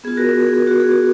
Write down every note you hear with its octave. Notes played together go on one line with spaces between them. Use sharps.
B3 F4 G#4
F#4 A#4
G#4
G#4
F#4
G#4
F#4